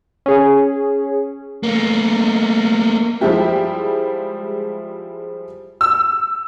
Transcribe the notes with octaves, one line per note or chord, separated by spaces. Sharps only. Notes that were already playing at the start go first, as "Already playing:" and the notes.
C#4 G#4
A3 A#3
F3 G3 G#3 E4 G4
E6